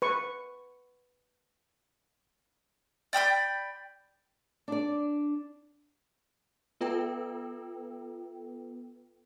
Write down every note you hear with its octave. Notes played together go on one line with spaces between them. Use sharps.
B4 C#6
D5 G5 B5 G6
D4 D5
B3 F4 A4 B4 G5